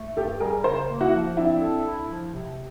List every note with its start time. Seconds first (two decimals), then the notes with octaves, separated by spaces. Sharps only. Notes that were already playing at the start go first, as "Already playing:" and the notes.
Already playing: A3
0.17 G2 G4 A4
0.40 G3 G#4 A#4
0.64 C#3 A#4 C5
0.89 A#3
1.01 E4 F#4
1.14 F3
1.37 C4 D4 E4
1.61 A4
1.85 E4
2.09 F3
2.34 C3